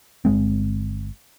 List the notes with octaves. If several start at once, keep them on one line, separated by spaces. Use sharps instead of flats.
G1 G#3 C4